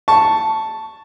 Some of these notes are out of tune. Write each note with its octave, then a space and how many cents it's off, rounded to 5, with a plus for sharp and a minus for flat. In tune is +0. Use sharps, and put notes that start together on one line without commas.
A5 +0 C#6 +0